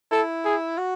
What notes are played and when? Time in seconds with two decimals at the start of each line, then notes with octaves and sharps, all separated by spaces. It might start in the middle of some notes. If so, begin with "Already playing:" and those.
0.11 E4 A4
0.45 G#4
0.78 F#4